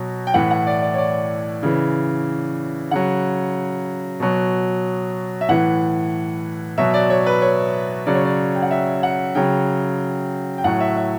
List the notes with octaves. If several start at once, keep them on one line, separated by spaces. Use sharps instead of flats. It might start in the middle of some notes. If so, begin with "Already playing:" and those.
Already playing: B2 F#3
G5
A2 E3 F#5
F#5
D5
D5
C#5
D5
C#3 E3
C#3 F#3 F#5
B2 F#3
E5
A2 E3 F#5
B2 F#3 E5
D5
C#5
B4
C#5
C#3 F#3 D5
C#5
D5
G5
F#5
E5
F#5
C#3 F#3 G5
G5
A2 F#3 F#5
E5
E5